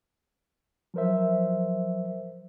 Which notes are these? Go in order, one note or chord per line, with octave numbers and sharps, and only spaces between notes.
F3 F#3 A#4 C5 E5